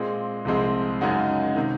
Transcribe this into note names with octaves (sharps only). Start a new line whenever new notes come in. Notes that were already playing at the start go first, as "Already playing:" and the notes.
Already playing: A#2 G#3 C4
C2 C3 F3 G#3 C4
F#2 C#3 G#3 D#4 F#4
C3 D#3